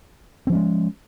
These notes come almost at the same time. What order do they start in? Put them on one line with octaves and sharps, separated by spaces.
C4 F3 C#4 G#3